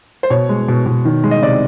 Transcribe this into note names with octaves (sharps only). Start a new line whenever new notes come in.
C5
B2 C#5
G#3
B2
B2
D#3
G#3
D#5
C3 D5